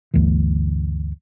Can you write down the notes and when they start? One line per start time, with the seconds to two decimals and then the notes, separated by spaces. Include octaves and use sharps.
0.14 G1 D2 D3 E3